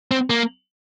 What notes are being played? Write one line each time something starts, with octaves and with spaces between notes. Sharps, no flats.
C4
A#3